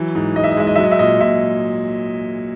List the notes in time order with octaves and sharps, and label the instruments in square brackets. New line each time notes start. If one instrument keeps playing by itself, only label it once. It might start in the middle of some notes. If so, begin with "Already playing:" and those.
Already playing: [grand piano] E3 F#3
G#2
G#2 D#5
E5
D#5
G#3 E5
D#5
F#3 E5
D#5
E5
A#2 D#5
A#2 E5